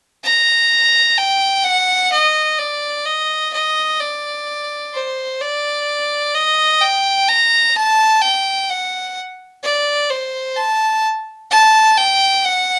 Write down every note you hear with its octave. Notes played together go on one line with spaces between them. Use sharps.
A#5
G5
F#5
D#5
D5
D#5
D#5
D5
C5
D5
D#5
G5
A#5
A5
G5
F#5
D5
C5
A5
A5
G5
F#5